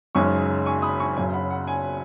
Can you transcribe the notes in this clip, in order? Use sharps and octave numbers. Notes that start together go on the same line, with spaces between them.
F#1 F#2 C#3 G#3 D#4 G#5 C#6
G#5 C#6
B5 D#6
G#5 C#6
F#1 F#2 C#3 G#5
F#5 B5
F#5
G#5